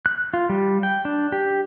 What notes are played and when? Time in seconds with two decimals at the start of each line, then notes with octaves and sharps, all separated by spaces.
0.06 F#6
0.34 F4
0.49 G3
0.83 G5
1.05 D4
1.32 G4